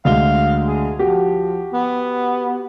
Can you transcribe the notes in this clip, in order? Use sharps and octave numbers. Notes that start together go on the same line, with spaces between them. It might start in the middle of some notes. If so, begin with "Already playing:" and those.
D2 G#3 F5 G7
G#4
F3 F#4 G4
B3